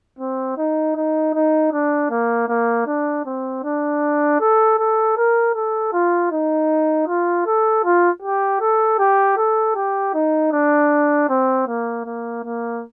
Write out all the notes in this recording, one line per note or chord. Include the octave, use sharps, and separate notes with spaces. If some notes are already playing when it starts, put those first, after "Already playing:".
C4
D#4
D#4
D#4
D4
A#3
A#3
D4
C4
D4
A4
A4
A#4
A4
F4
D#4
F4
A4
F4
G4
A4
G4
A4
G4
D#4
D4
C4
A#3
A#3
A#3